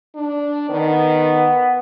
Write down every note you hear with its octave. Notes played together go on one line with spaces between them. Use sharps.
D4
D#3 B3